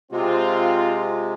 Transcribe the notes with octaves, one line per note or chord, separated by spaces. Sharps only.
C3 G#3 C4 F4